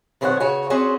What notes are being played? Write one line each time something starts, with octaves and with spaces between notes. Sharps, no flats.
F#2 B2 D#3 C4 C#5 F#5
C#3 F#4 C#5 G#5
C4 C#4 F#4 G#4 C5